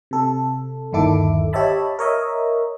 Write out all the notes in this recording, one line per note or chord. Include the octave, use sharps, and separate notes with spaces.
C3 A4
G1 D#2 D#3 E4 A4 D6
G4 C#5 D#5 E5 A5 B5
A#4 C#5 D#5 E5